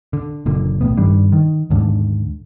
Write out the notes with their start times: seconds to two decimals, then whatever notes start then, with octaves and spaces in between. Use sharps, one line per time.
0.13 D3
0.46 F#1 A#2 D3
0.81 A#1 E2 A2 B3
0.97 G2 D#3 G3 D4
1.32 D#3
1.70 D#2 G#2 D3